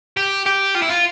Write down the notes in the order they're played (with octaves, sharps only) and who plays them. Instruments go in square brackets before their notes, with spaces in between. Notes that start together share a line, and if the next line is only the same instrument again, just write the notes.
[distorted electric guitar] G4
G4
F4
E4
F4